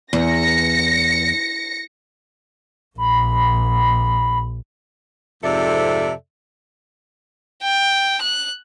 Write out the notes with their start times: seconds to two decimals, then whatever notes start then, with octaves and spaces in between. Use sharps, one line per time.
0.13 E2 A#6 C#7
2.98 A#1 B5
5.43 F2 G#2 C3 A4 D5 E5
7.63 G5
8.21 F#6